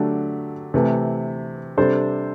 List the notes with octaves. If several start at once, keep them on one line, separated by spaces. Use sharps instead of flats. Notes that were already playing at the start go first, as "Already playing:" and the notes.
Already playing: D3 F#3 A3 D4 G4
C3 E3 A3
C3 G3 D4 A4 C5